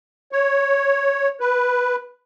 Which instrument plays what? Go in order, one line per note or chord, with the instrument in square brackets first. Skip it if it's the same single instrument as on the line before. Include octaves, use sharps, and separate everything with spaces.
[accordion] C#5
B4